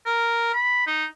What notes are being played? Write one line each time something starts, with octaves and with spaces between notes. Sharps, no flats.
A#4
B5
D#4